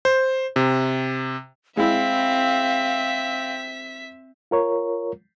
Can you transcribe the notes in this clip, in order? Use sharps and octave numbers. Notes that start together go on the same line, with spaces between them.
C5
C3
G#3 C4 E4 E5 F5 B6
F4 A#4 C#5